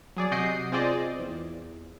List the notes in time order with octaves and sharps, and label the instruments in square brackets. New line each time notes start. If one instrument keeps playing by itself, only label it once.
[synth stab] F#3 G#4 D5
C3 F#4 D#5 G6 C7 D7
C4 F4 G#4 C5 D5 D#5
E2